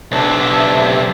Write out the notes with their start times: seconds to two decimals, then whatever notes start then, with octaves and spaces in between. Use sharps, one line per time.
0.12 B1 C3 D4 E5